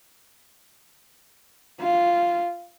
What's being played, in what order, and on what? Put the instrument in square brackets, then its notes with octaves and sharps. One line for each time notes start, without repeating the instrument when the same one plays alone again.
[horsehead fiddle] F4